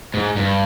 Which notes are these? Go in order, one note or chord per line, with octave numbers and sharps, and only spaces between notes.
G#2
G2